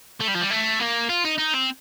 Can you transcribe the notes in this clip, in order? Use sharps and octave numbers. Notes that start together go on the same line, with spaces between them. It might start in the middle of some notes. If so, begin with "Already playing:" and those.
A3
G3
F3
G3
A3
A#3
F4
D#4
D#4
C4